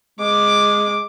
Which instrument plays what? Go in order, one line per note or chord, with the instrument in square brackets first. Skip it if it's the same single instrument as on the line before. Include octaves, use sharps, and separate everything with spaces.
[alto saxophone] G#3 [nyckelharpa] D6